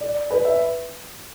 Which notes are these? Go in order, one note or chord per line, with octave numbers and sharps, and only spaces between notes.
D5
B4
E5